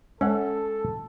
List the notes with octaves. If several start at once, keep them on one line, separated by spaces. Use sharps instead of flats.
G#3 C#4 A4 F#5